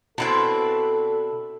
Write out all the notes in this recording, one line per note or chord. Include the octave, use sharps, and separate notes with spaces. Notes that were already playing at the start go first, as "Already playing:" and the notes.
B2 C4 D4 E4 A4 B4